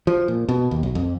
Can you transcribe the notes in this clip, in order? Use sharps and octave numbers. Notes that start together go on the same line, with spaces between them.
F3
A#2
B2
D#2
B1
F2